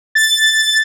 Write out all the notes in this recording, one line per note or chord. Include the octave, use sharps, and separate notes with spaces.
A6